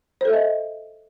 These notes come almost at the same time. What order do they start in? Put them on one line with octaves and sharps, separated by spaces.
C5 A4 E5 D#5